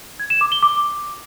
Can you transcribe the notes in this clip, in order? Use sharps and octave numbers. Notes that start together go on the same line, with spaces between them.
G#6
E7
D6
G7
D6